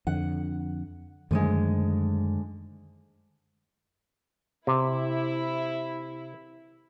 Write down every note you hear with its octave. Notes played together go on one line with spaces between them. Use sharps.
F2 D3 F#5
F#2 D3 D#3 F3 G#3 A3
C3 E4